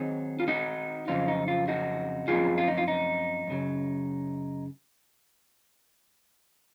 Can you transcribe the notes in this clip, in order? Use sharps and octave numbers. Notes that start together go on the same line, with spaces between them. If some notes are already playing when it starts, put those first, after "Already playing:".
Already playing: D#3 F#3 C4 D#4 G#4
F4
D#4 F#4
F2 C#3 F#3 C4 D#4 F4
D#4
F4
D#4 F#4
F#2 F3 C4 D#4 F4 G#4
F4
D#4
F4
D#4
F#2 C#3 F#3